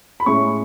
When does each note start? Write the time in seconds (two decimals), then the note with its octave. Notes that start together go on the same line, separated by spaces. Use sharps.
0.20 B5
0.26 A2 G#3 C#4 E4 C#6